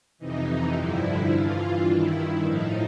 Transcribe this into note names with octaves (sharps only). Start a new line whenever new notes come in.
F2 C3 E3 D#4
G2 D3 F3 E4
G2 E3 F4
G2 D#3 E4
A2 F3 D#4